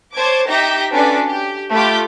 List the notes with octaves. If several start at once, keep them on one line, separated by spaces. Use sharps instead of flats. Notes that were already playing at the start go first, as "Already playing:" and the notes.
C5 C#5 A5 D6 G#6
D#4 G4 E5 G6 A#6
C#4 D4 F#4 A4 B4 D5
G4
A3 F4 G4 B5 D6 G6